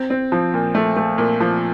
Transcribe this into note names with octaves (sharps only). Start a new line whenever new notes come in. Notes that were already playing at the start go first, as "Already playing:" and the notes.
Already playing: C4
C4
F3
A#2
A3
A3
A#2
F3